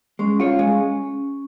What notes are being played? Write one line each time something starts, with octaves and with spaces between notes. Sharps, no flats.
G#3 C#4
F4 C#5
G#3